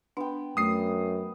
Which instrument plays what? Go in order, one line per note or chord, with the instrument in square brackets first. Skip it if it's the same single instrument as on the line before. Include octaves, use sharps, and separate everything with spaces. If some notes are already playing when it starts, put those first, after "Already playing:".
[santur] B3 G5 [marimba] D4
[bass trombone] F#2 [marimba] A3 [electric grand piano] D#6 C7